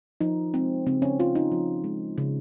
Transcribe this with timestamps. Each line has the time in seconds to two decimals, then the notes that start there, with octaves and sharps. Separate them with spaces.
0.21 F3 D#4
0.53 G#3 C4
0.87 C#3 C4
1.02 C#4
1.19 C#3 F4
1.35 D#4
1.52 F3
1.84 G#3
2.18 C#3